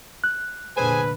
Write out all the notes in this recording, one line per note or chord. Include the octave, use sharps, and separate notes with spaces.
F#6
F1 A#2 D3 G#4 B4 C5 G#5